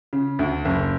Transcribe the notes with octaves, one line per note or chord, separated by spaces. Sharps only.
C#3
D2
F#1